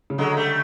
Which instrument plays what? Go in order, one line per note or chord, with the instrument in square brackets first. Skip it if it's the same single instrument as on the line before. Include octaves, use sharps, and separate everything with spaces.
[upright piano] C#3
[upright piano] D3 [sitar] F#3 G#3
[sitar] G3 A3